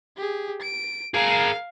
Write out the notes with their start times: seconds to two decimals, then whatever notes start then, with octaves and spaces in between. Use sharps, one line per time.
0.17 G4 G#4
0.62 D7
1.14 G#4 A#4 F5